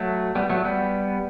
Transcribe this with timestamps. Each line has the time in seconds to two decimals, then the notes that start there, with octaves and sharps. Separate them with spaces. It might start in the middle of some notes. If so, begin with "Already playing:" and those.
Already playing: F#3 A3
0.35 G3 B3
0.50 F#3 A3
0.65 G3 B3